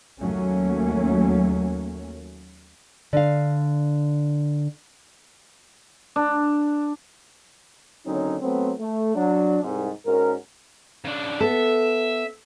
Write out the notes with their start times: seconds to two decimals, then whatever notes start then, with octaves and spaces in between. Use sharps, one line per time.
0.21 D#2 F#3 A3 A#3 C#4
3.13 D3 F5
6.16 D4
8.06 D#2 D3 F#3 C4 C#4 D#4
8.40 F#3 A3 B3 C4
8.79 A3
9.15 F#3 D4
9.63 C2 G#2 C3
10.06 G#2 C#4 F#4 A#4
11.05 C#3 D4
11.40 B3 A4 E5